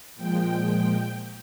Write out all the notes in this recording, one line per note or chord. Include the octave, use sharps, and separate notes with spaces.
A#2 F3 G#3 G5